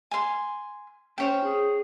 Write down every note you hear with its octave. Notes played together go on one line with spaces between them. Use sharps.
G#5 C6
C#4 C5 C#5 G5
G#4